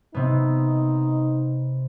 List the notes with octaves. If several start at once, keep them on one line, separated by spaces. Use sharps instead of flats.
C3 B3 D#4